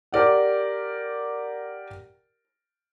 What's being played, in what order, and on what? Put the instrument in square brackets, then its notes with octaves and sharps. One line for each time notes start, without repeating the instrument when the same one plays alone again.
[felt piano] G4 A#4 D5 F#5